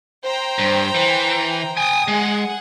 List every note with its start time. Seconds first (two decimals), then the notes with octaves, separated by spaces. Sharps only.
0.23 C5 G5 A#5
0.59 G2
0.95 E3
1.77 G5 G#5 D#6
2.08 G#3 G#4 F#5